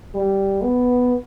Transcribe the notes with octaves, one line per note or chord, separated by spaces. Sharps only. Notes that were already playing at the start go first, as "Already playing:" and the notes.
G3
B3